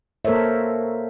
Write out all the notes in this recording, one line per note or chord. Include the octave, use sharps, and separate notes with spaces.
A#3 A4 A#4 C5 C#5 E5